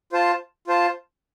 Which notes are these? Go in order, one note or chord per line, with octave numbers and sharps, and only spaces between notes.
F4 C5 A5
F4 C5 A5